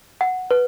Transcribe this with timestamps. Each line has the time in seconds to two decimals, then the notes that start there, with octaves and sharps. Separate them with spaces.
0.21 F#5
0.51 B4